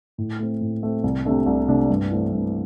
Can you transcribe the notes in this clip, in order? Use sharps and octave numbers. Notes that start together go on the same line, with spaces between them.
A2
A3 C4
A2
A3 C4
C2
C3 A3 D4
C2
C3 A3 D4
G2
E3 A3 C4
G2